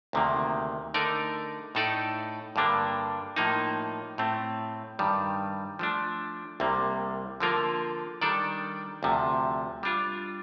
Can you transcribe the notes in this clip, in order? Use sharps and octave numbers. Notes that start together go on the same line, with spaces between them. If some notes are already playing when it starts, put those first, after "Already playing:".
D2 C3 D#3 A#3
D3 A3 D#4 A#4 D5
A2 A3 D#4 A4 D5
G2 D3 G3 A#3 D4
A2 F3 A#3 D#4
A2 A3 C4
G2 D#3 G3
F3 A3 D4
C2 C3 G3 A#3
D3 F3 A#3 F4 A#4
D#3 G3 D4 A4 D5
D2 C3 F3
G3 D4 F4